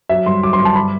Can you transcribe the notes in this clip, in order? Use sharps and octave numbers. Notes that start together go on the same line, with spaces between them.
F#3 E5
G2 C6
F#3 D6
C6
G2
A5
B5